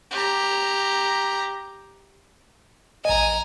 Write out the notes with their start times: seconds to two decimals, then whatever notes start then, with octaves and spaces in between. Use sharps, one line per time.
0.11 G4 A#5
3.05 A1 D#5 G#5 A#5